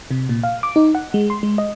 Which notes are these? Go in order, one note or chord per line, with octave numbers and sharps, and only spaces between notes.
C3
A#2
F5
D6
D#4
F#5
G#3
C6
G#3
D#5